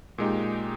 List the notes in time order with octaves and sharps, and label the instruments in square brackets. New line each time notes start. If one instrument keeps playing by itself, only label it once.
[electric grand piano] A#2 G#3 D#4 G4